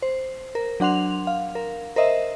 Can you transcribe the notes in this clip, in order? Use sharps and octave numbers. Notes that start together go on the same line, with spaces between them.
C5
A#4
F#3 D4 F#5 C6 F7
F5
A#4
A#4 C5 D#5 E5